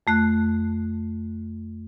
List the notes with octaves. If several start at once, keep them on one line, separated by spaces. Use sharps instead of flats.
F2 A3 F#6